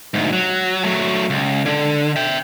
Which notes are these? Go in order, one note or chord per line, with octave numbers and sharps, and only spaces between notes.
D2 G#2
F#3
F#3 A3
C#2
D3
E5 G5